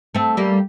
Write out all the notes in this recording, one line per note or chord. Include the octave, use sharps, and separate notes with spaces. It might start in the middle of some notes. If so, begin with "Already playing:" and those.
A3 C4
G3 A#3